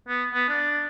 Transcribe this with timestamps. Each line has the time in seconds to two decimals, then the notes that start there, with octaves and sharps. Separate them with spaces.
0.08 B3
0.34 B3
0.49 D4